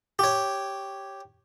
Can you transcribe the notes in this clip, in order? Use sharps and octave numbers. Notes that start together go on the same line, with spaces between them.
G4 C#5